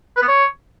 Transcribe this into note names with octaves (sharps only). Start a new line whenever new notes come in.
B4
B3
C#5